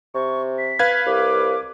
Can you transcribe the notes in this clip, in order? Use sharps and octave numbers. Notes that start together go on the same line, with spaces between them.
C3 C#6
B6
B4 F5 G#6
C2 D6